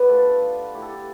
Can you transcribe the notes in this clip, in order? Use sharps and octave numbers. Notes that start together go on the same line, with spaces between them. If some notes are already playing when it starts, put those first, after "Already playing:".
Already playing: B3 B4 D5
G3 A3 D4 F4 A4
A3 E4 G4
A4
G4